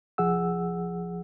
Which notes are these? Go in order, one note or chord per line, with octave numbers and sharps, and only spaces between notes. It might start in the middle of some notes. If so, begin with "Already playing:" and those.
C2 F3 G#4 F#5 E6